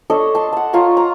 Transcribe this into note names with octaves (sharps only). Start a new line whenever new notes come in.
D4 A4 C#5 D#5
A5 C6
F#5 A5
F4 C#5 A#5 C#6
A#5